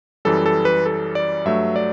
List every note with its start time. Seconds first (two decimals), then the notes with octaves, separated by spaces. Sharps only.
0.25 F#2 E3 G3 A4
0.46 A4
0.65 B4
0.86 A4
1.15 D5
1.45 G2 F#3 A3 E5
1.76 D5